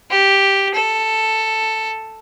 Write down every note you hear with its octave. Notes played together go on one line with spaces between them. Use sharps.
G4
A4